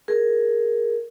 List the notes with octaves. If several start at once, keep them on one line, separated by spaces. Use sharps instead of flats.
G#4 A#4